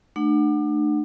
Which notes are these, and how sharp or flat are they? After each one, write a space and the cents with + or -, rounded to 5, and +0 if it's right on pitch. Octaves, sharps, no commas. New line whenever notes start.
A3 +0 D4 +35 F#5 +0